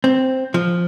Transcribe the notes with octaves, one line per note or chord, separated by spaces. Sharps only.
C4
F3